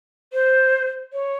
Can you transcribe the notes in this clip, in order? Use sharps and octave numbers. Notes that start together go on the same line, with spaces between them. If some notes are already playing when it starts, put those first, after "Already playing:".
C5
C#5